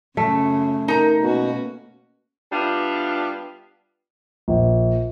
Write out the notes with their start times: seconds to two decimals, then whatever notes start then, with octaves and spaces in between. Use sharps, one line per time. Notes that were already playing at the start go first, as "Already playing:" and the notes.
0.17 F#2 C#3 A3
0.88 D#4 A#4 A#5
1.21 B2 A#3 C#4 F#4
2.52 G3 B3 D4 E4 F4
4.48 A#1